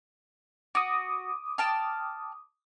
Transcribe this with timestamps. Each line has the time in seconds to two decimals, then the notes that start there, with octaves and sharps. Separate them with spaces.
0.75 F#4 D6 D#6
1.58 G5 A5 F6